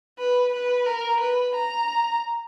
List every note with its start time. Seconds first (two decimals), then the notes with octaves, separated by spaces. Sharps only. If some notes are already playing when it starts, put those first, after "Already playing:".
0.19 B4
0.53 B4
0.87 A#4
1.20 B4
1.55 A#5